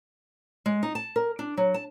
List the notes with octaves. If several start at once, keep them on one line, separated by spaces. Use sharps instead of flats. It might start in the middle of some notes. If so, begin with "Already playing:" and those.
G#3
D#4
A5
A#4
D4
F#3
A5